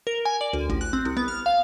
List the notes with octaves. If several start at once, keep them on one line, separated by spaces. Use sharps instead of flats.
A#4
G#5
D5
D2
A1
F#6
C4
C2
B3
F6
F5